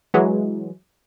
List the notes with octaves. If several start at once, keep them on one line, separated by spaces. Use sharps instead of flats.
E3 F#3 G#3